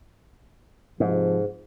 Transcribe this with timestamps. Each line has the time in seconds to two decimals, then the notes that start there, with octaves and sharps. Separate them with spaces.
1.00 G#2 C3 F3